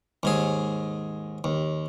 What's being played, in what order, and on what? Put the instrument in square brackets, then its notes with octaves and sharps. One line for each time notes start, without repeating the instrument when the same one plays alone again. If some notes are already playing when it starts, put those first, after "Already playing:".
[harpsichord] D#2 G#2 G#4
D#2